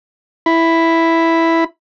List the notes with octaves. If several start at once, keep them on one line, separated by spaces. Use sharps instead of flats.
E4 B5